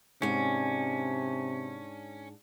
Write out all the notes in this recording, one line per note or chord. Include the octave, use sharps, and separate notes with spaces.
G#2 C3 C#4 D4